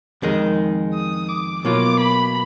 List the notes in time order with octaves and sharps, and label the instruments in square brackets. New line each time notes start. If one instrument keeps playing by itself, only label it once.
[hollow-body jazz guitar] F2 D#3 G#3 D#4
[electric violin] D#6
D6
[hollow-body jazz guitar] B2 F#3 A#3 F4 [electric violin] D6
[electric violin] B5